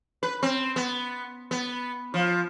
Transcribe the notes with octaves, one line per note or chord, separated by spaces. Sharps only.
B4
C4
B3
B3
F3